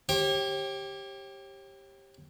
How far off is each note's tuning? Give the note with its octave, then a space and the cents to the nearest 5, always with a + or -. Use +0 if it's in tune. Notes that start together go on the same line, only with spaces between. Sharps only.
G4 +0 C#5 -40